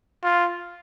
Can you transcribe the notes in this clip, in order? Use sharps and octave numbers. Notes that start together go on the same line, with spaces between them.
F4